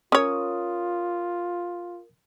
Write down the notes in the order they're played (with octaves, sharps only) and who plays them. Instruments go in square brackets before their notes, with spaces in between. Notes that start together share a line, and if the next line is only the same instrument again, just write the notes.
[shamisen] C#4 C#5 [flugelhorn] F4 [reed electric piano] A#4 D#6